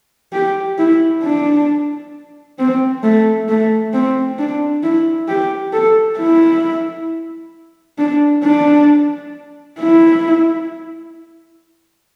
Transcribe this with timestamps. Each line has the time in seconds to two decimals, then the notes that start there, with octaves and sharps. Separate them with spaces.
0.33 G4
0.79 E4
1.23 D4
2.59 C4
3.04 A3
3.49 A3
3.93 C4
4.39 D4
4.83 E4
5.28 G4
5.73 A4
6.19 E4
7.99 D4
8.44 D4
9.80 E4